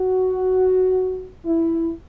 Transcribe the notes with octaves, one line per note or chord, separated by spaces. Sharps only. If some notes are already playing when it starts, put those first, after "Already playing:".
Already playing: F#4
E4